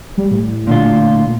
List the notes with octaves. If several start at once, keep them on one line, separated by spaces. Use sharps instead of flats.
G3
A2
A#2 D3 F4